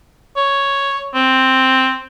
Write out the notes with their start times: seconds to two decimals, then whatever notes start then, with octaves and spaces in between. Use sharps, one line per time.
0.36 C#5
1.15 C4